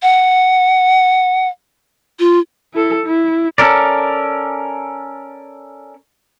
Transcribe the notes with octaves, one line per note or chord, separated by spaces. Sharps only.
F#5
F4
E4 A4
E4
C#4 A4 A#4 D5